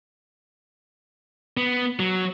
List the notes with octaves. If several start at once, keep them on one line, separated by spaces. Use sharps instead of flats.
B3
F#3